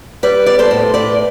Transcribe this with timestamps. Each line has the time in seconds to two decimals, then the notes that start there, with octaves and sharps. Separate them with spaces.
0.23 G3 B4 D5
0.46 B3 D5
0.59 A4 C5
0.71 A2
0.94 A2 B4 D5